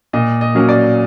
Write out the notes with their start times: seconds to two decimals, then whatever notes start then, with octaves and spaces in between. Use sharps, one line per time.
0.13 A#2 D#5
0.41 D#5
0.55 F#3 A#3 C#4
0.69 D5